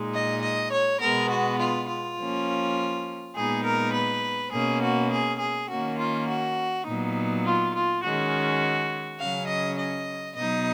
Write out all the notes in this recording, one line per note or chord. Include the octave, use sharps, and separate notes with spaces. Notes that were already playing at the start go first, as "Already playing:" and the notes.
Already playing: A#2 G#3 D#4
D#5
D#5
C#5
B2 G#3 B3 A#4
F#4
F4
F4
F3 A#3 C#4
A#2 G#3 B3 D#4 G#4
A#4
B4
B2 A#3 C#4 G#4
F#4
G#4
G#4
D#3 A#3 C#4 F#4
F4
F#4
A#2 F#3 B3 D#4
F4
F4
D#3 G#3 C#4 F#4
C#3 F#3 C#4 F5
D#5
D#5
B2 F#3 B3 D#4 D#5